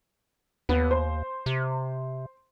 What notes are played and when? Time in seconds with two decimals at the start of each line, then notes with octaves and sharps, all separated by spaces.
0.69 D#2 B3
0.91 C5
1.46 C3